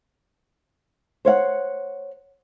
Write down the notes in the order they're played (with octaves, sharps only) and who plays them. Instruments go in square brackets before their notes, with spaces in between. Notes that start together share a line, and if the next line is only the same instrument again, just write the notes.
[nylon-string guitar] C5 C#5 F5 F#5